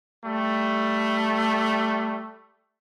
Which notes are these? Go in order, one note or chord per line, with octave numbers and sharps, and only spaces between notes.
G3 A3